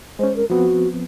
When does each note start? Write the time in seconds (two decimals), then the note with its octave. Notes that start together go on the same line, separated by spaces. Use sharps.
0.19 G#3 C#4 C5
0.36 A#4
0.50 F3 B3 C4 F#4